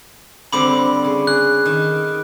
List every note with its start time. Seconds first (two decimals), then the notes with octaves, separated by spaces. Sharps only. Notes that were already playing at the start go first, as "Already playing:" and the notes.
0.53 D3 G3 C4 B5 D6
1.04 C#3
1.27 G#4 F#6
1.66 D#3